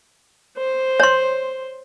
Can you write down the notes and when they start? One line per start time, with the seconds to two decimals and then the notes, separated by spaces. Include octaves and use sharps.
0.57 C5
1.00 C#5 C6